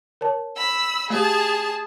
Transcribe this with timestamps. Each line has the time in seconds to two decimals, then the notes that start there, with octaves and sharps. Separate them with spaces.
0.21 A#4 C#5 A5
0.57 B5 E6
1.10 A3 G4 G#4 A5